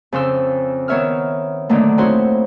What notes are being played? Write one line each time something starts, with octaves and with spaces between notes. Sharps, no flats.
F2 C#3 C5 E6
D#3 B3 C#5 E5 E6 F6
A#2 D3 D#3 F#3 A3 A#3
C4 D#4 E4 F#4 C5 C#5